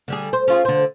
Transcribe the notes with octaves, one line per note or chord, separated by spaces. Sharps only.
D3 G3 G#4
C5
C#4 F4 G#4
D3 C5